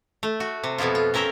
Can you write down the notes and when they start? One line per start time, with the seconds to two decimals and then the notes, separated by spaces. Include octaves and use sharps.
0.23 A3
0.40 F#4
0.64 C3
0.78 F2 B2 B3 E4 F4
0.95 F4
1.14 C4 C#4 A#4 E5 G5